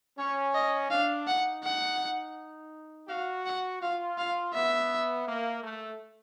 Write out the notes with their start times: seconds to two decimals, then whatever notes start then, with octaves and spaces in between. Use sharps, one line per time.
0.18 C#4 C#5
0.55 D#5
0.91 D4 F5
1.27 D#4 F#5
1.64 F#5
3.09 F#4 F5
3.46 F#5
3.82 F4 F5
4.18 F5
4.54 B3 E5
5.27 A#3
5.64 A3